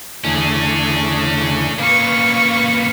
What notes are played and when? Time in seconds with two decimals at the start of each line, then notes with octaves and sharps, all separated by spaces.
0.24 E2 D3 A3 C#4 G#4
1.79 A#2 C#3 B4 F5 C#6